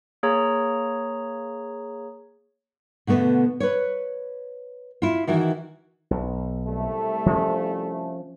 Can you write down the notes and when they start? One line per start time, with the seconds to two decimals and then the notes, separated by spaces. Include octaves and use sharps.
0.23 A#3 G#4 C#5 A#5
3.07 B2 D3 A3 B3
3.60 B4 C#5
5.02 E4 F4
5.27 D#3 E3 E4 F#4
6.11 B1
6.65 C2 G3 A3
7.26 F3 C#4